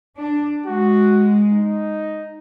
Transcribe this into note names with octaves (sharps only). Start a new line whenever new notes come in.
D4
G#3 F#4
D#4